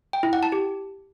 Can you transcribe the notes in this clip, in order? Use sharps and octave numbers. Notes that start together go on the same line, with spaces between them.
G5
E4
F#5
A5
G4